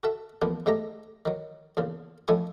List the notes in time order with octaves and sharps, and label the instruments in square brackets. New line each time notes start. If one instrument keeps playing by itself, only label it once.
[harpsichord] F#4 A4 E5
A1 F3 A#3 B3
G#2 G3 A3 G4 A#5
D#3 F#3
E2 A#2 C#3
F2 A2 F3 E4 G#5 C#6